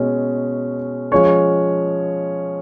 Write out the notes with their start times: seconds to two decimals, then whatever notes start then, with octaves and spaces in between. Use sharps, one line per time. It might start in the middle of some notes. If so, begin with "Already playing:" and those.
Already playing: B2 G#3 C#4
1.12 F3 G#3 C#4 C#5